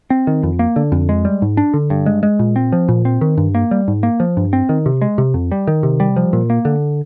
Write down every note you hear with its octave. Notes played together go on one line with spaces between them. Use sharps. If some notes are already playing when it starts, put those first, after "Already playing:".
C4
D#3
F2
A#3
D3
F2
G#3
G3
G#2
D4
D3
G2
G#3
G#3
A#2
C4
F3
A#2
C4
D#3
G2
A#3
G3
G#2
A#3
F3
G2
C4
D#3
C3
G#3
C3
F2
G3
D#3
C3
G3
F3
A#2
A#3
D3